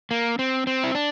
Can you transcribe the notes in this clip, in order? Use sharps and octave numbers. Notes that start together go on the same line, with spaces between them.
A#3
C4
C4
E4
D4